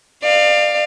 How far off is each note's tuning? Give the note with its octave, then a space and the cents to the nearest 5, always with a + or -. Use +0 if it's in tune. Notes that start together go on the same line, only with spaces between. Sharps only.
D5 +35 F5 +0